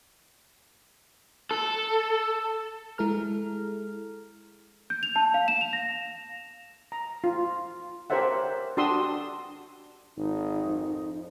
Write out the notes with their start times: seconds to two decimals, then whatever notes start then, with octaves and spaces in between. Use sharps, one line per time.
1.51 A4
2.98 G#3 E4 G#4 A4 A#5 F6
4.90 G6
5.03 F7
5.16 A5
5.34 F5
5.48 E7
5.61 F7
5.73 A#6
6.92 A#5
7.24 F4
8.10 G4 A#4 C5 C#5 E5 F#5
8.77 D4 F#4 G4 C6 D#6 E6
10.17 G#1 D#4
10.66 F2